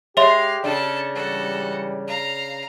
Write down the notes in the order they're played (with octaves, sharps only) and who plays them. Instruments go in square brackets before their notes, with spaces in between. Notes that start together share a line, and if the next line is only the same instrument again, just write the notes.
[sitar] G#3 [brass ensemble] G4 [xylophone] C#5 E5 C6 [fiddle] F5
[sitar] C#3 D4 [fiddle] A4 A5
[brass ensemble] G#2 E3 G3 [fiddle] F#4 A4
[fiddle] F5 A#5